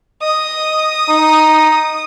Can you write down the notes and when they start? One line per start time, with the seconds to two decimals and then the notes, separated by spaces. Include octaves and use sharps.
0.22 D#5 D#6
1.09 D#4